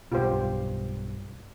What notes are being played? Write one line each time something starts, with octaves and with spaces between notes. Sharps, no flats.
B1 G2 F4 G4 C5